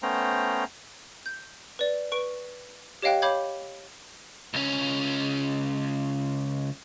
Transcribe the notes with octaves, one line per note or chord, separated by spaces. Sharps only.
A3 B3 C#4 C5 G5 A#5
G6
B4 D5
B4 C#6 D7
G4 C#5 D#5 F5 G5 F#6
C#5 F5 B5 D6 G6 G#6
C#2 C#4